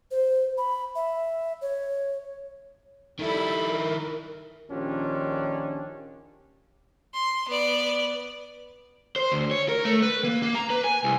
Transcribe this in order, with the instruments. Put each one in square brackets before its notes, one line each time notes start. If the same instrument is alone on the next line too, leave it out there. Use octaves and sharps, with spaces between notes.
[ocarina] C5
B5
E5
C#5
[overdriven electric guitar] D#3 E4 [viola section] G3 A4 B5
[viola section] A#4
[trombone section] A#1 D#3 C#4 D4 F4 G4
[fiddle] C6
B3 D5
[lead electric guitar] C5
D2
C#5
A#4
A3
B4
A#3
A#3
A#5
B4
G#5
C2